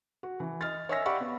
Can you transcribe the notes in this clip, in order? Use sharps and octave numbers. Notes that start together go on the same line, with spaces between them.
F#4
E3
D#5 F6 A6
C#5 D#5 E5 G#5 E6 A#6
G4 D5 F5 F#5 B5 C#6
B3